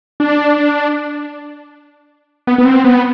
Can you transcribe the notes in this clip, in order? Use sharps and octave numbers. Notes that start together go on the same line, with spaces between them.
D4
B3
B3
C4
B3